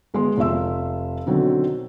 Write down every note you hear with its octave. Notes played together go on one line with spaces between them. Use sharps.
G1 G#3 B3 C6
F1 F4 E5 E6
B2 D3 D#3 F#3 C4